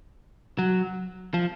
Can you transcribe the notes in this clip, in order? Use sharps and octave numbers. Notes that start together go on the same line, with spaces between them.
F#3
F3